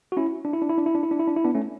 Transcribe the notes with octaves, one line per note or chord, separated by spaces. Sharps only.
F#4
C#4 E4
D4
E4
D4
E4
D4
E4
D4
E4
D4
E4
D4
E4
B3 D4
A3 C#4